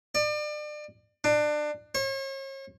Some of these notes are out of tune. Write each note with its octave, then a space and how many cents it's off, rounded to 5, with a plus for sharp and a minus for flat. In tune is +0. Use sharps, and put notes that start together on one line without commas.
D5 +35
D4 +25
C#5 -40